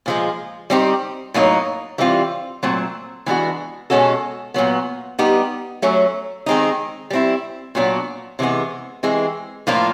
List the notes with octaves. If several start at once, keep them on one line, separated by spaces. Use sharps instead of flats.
A#2 F3 G#3
G3 C4 D#4 G4
A2 F#3 A#3 D#4
E3 G3 C4 F4
A#2 F#3 A3 C4
E3 G#3 B3 D4 F#4
B2 G#3 C#4 F#4 A4
A#2 F#3 B3
G3 B3 D#4 G4
F#3 A3 C#4
D#3 G#3 C4 D#4
G3 C4 E4
A#2 F#3 B3 D4
C3 E3 G#3 B3
E3 G#3 C4
A2 F3 A#3 D4 F4